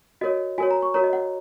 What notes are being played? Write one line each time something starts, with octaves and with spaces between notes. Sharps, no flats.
F#4 A#4 C#5 D#5
F#4 A#4 C#5 G#5
A#5
C#6
F#4 A#4 C#5 A#5
D#5
F#5